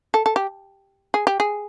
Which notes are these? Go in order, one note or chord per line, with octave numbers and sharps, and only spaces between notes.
A4
A4
G4
G#4
G4
G#4